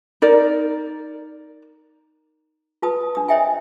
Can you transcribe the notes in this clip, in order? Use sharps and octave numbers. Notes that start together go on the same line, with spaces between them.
D#4 A#4 D5
F4 B4 A5 D#6
D4 D#6
C5 C#5 D#5 E5 G5 G#5